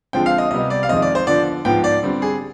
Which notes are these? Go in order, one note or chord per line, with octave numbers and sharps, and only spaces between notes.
D3 F3 G#3 C4 G5
F5
D#5
C3 G3 B3 D#5
D5
F5
F2 D#3 G#3 C4 D#5
D5
C5
D3 F3 B3 D5
G#2 F3 B3 G5
D5
D3 G3 C4
G#4